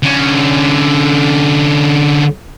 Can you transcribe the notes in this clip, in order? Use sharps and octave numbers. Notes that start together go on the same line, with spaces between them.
D3 C#4